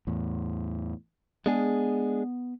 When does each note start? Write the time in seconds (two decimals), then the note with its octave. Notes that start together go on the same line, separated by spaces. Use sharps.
0.07 E2 A2
1.46 G#3 B3 D4 G#4